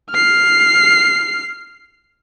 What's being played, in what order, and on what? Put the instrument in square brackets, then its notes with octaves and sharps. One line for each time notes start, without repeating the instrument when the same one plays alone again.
[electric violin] F6 C7